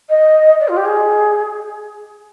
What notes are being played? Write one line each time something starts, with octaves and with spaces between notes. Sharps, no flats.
D#5
D5
F4
G4
G#4